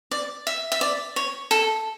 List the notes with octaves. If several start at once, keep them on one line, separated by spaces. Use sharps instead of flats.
D5
E5
E5
D5
C#5
A4